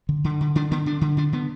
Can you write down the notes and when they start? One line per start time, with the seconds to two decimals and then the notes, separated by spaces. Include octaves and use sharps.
0.09 D3
0.24 D3
0.41 D3
0.55 D3 D4
0.71 D3 B3
0.86 D3 D4
1.01 D3
1.17 D3 D4
1.33 D3 B3